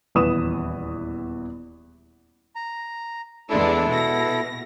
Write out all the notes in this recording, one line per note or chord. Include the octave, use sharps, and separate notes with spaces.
D#1 E2 E3 B4 D#6 E7
A#5
E2 G#3 D4 E4 A4
B2 A#6